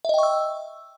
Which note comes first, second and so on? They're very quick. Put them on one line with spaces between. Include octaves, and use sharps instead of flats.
E5 D#5 G5 C#6 E6